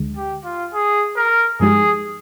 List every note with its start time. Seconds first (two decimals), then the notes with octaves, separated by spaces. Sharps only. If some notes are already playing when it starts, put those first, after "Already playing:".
Already playing: D2 D3 G#3
0.17 G4
0.45 F4
0.74 G#4
1.16 A#4
1.60 G2 F3 G#3 D#4 G4 G#4